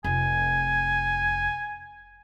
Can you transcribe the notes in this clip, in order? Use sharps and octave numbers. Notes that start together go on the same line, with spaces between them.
F1 G#5